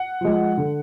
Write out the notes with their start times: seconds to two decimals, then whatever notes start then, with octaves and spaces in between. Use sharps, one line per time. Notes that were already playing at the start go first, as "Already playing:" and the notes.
Already playing: F#5
0.21 F3 G#3
0.57 D3